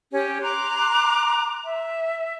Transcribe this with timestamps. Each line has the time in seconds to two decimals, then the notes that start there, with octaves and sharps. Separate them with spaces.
0.11 C#4 G4
0.41 A#5 C6 D6 F#6
1.65 E5